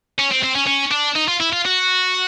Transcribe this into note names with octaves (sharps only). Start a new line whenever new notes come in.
C#4
C4
C4
C#4
C#4
D4
D#4
F4
E4
F4
F#4